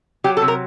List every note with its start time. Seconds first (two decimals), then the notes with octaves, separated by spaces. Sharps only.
0.24 F#3 G4
0.37 A4
0.42 C3
0.48 A#4